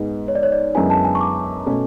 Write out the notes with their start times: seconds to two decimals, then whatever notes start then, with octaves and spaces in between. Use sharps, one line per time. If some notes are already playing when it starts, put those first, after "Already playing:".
Already playing: G#2 G#3 B3
0.28 C#5
0.35 D5
0.43 C#5
0.52 D5
0.75 F#2 D3 G#3 B3 E4 G#5
0.90 A5
1.05 G#5
1.15 C#6
1.21 D6
1.66 B2 A3 C#4